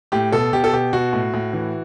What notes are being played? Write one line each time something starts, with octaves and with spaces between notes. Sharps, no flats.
A2 G4
B2 A4
B2 G4
A4
B2 G4
B2 F#4
A2
A2
E3